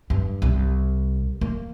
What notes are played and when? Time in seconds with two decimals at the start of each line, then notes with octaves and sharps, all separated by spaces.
0.10 G2
0.42 C2
1.41 A#3